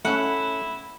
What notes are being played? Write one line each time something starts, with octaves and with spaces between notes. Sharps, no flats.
A3 C#4 E4 F#5